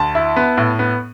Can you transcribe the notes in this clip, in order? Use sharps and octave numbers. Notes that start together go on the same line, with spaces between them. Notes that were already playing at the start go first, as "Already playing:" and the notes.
Already playing: D2 A5
E4
B3
A2
B3